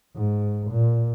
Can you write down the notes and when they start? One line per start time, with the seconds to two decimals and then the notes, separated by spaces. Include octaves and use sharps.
0.16 G#2
0.71 A#2